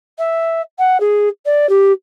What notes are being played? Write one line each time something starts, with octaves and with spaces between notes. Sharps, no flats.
E5
F#5
G#4
D5
G4